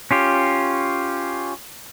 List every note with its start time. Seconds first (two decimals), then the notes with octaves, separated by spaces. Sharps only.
0.11 C#4 F4 G4